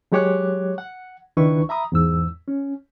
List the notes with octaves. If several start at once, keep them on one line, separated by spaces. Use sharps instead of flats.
F#3 G#3 G4 C#5 D6 F#6
F#5
C#2 D#3 D4 E4 B4 C#6
E5 A#5 B5 D#6
E2 G#2 E6
C#4